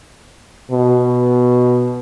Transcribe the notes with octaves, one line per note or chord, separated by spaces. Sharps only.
B2